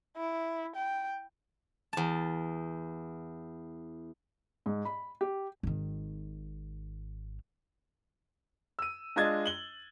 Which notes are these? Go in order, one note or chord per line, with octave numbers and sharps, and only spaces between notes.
E4
G5
E2 A5
G#2
B5
G4
G#1 D#3
E6 D#7
G#3 D4 F4 D#5 G#6 A6
F#7 G7